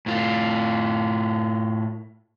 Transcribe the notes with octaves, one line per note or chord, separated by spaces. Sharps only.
A2 F4